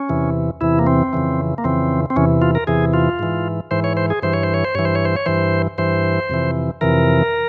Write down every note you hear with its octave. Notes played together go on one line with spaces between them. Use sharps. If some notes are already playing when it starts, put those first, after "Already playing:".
Already playing: C#4
E2 C3 E3
E2 C3 E3 E4
A#3
C4
F2 C#3 E3
A#3
F2 C#3 E3 C4
C4
E2 C3 E3 C#4
F4
A#4
E2 C3 E3 G#4
F4
G#2 E3
G#2 E3 C5
C#5
C5
G#4
G2 E3 C5
C#5
C5
C#5
C5
G2 E3 C#5
C5
C#5
C5
C#5
G2 E3 C5
G2 E3 C5
F2 C3 E3
F2 C3 E3 A#4